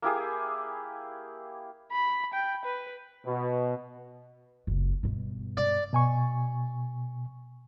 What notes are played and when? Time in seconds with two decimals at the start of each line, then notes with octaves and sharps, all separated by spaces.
0.02 A#3 E4 G4 G#4
1.92 B5
2.33 G5
2.65 B4
3.26 B2
4.67 F#1 C#2
5.03 G2 B2
5.57 D5
5.93 B2 G#5 C#6